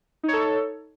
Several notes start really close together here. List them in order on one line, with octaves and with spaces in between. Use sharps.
D#4 C#5 A4